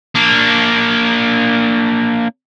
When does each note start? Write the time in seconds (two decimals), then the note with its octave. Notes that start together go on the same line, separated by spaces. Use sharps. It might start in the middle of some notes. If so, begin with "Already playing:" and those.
0.15 A#3 D4